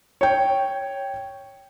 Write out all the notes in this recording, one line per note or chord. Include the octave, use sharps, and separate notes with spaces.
C#5 G5